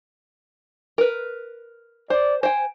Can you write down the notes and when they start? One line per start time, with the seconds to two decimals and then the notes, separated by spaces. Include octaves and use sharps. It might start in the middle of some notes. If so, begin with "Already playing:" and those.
0.98 A#4 B4
2.10 C5 D5
2.43 C5 G5 G#5